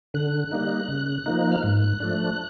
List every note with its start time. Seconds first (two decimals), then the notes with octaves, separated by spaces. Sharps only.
0.14 D3 F#6
0.51 G3 A#3 D#4
0.88 C#3
1.26 F3 A#3 D#4
1.52 F6
1.63 G#2 F#6
2.00 F3 A3 D4